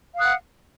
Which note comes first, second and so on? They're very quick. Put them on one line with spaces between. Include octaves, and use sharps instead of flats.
F5 D#6 F#6 F#5